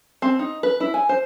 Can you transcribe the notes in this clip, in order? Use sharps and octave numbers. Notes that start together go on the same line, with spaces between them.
C4
D#4
B4
E4
G#5
C5